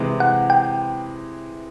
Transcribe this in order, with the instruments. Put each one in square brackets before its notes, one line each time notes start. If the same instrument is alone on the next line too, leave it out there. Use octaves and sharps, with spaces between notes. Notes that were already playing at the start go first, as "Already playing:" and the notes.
Already playing: [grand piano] C3 E3 G#3
[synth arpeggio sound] F#5
G5